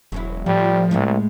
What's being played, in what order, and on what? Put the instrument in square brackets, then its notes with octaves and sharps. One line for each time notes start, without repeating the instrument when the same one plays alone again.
[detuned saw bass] E1 [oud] F#3 C#4 E4
[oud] A2 [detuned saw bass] F3 [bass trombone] G3
[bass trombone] C2 [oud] A2 G#3 A3